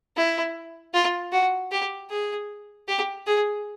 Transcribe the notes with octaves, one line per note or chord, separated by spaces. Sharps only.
E4
F4
F#4
G4
G#4
G4
G#4